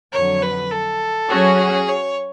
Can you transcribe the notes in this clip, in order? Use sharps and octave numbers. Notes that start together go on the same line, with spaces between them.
F2 D3 F#3 C#5
B4
A4
F#3 C#4 F#4 G#4 C#5
C#5